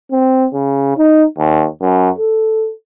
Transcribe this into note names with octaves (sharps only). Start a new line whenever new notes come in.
C4
C#3
D#4
D#2
F#2
A4